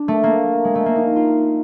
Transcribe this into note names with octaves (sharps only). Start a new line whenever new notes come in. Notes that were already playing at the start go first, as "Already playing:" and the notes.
Already playing: D4
A3
A#3
G#3
A3
A#3
D#4
F4